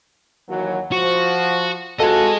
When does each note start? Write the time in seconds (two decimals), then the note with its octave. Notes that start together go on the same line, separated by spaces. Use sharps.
0.49 D#2 E3 F#3
0.92 F3 F#4
2.00 C3 F4 F#4 G#4 A4 D#5